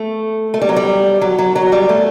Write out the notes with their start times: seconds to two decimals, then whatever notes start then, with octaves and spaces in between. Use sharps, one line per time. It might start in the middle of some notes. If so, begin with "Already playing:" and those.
Already playing: A3
0.54 A3
0.61 G3
0.69 F#3
0.76 G3
1.21 F#3
1.38 F#3
1.55 F#3
1.72 G3
1.89 A3